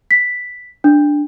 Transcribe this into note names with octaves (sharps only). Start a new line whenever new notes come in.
B6
D4